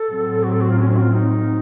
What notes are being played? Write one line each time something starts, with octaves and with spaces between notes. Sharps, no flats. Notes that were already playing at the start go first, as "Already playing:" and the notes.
Already playing: A4
A2 F#3 C4
F#4
A4
F#4
F4
C#4
C#4
F#4
F4
D#4